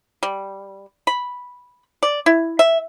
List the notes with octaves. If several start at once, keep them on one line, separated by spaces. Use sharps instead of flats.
G3
B5
D5
E4
E5